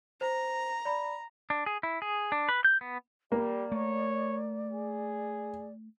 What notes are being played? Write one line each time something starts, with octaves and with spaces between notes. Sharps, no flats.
C5 A#5
D5 B5
D4
G#4
E4
G#4
D4
B4
G6
B3
G3 A#3 D5
A3 C#5
G#4